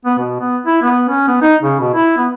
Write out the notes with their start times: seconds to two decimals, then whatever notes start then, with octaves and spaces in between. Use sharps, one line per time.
0.05 B3
0.18 B2
0.40 B3
0.66 E4
0.83 B3
1.09 C#4
1.28 B3
1.42 D#4
1.63 C#3
1.79 B2
1.94 E4
2.18 B3